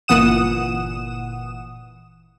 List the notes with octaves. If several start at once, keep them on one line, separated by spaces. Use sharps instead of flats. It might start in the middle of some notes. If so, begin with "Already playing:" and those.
G1 A#2 E3 F#5 D#6 E7